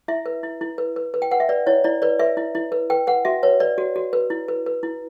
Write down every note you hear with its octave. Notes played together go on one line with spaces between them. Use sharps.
E4 E5
B4
E4
E4
B4
B4
B4
G5
B4 F#5
E5
B4 D5
E4 C#5
E4 D5
B4 D5
B4 E5
E4
E4
B4
B4 G5
B4 F#5
F#4 E5
B4 C#5
B4 D5
F#4
F#4
B4
E4
B4
B4
E4